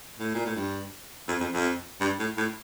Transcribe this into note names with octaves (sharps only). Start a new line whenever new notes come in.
A2
A#2
A2
G2
F2
F2
F2
G2
A2
A2